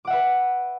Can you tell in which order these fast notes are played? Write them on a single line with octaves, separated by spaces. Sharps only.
D6 F#5 E5 B4